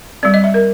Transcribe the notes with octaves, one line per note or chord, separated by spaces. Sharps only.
G3 C4 D5
D#5
E5
A#4